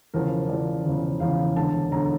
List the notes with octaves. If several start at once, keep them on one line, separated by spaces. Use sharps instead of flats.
E1 E2 C#3 F3 A#4
E1 E2 C#3 F3 D5
E1 E2 C#3 F3
E1 E2 C#3 F3 F5
E1 D2 D3 A5
E1 D3 A#5